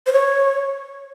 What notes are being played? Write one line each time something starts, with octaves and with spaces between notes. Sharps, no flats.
C5
C#5